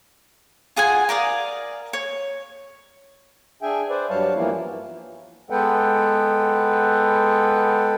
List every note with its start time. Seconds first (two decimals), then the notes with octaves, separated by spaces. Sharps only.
0.76 F4 G#4 F#5 G#5
1.09 A#4 D5 F5 D#6
1.93 C#5
3.62 D4 G#4 E5 G5 G#5
3.89 B4 C5 D5
4.10 G2 F#3 G3 C#5 F5 A5
4.36 E3 F3 A#3 B3 E4
5.50 G#3 B3 A4 B4 F#5 G5